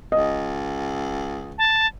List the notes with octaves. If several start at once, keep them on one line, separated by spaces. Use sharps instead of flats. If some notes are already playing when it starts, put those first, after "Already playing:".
C#2 D#5
A5